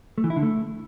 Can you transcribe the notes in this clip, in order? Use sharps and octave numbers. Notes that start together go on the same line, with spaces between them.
A3
E3
E4
D3
A3